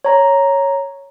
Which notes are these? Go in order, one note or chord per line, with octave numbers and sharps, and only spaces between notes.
C#5 A#5